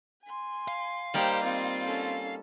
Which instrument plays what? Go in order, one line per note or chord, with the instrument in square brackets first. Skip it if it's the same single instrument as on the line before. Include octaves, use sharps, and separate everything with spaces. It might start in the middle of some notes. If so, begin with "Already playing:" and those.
[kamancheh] G#5 C6
[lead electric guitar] F5
[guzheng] G3 A#3 D#4 [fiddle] G4 C5
[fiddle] C4 F4
[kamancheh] C#4 A4